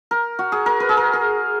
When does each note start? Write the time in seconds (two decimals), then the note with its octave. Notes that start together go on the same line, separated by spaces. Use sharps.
0.11 A#4
0.39 F#4
0.52 G#4
0.66 A#4
0.80 B4
0.89 G#4
0.97 A#4
1.13 G#4